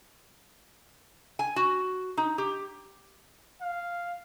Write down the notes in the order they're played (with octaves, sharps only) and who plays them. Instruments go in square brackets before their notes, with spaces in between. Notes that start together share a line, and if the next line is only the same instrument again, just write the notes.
[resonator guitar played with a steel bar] G#5
F#4
D#4
G4
[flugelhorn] F5